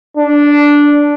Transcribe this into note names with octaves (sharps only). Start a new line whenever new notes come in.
D4